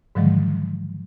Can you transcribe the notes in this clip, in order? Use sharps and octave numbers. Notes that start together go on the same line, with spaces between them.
G#2 D3 D#3 F3 F#3 G#3